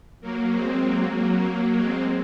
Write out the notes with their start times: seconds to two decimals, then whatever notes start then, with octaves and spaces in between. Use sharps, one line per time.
0.21 F#3 A#3
0.52 G#3 C4
0.84 F#3 A#3
1.15 F#3 A#3
1.77 G#3 C4